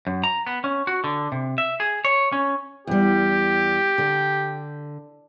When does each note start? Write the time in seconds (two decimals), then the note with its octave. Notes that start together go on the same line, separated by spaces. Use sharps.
0.07 F#2
0.24 A#5
0.47 B3
0.64 C#4
0.87 F#4
1.04 D3
1.32 C3
1.58 E5
1.80 G#4
2.05 C#5
2.32 C#4
2.87 E2 G3 G4
3.98 D3